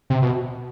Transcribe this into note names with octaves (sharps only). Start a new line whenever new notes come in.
C3
B2